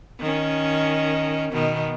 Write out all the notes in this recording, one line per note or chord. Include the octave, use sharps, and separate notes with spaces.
D#3 C#4
B2 D#3 B3